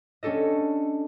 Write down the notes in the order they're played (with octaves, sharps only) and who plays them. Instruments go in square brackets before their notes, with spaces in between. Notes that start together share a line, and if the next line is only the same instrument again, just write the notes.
[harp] C#4 D4 G4 A4 D#5